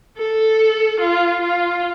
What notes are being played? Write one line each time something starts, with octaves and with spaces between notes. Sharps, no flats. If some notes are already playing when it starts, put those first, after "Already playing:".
A4
F4
F4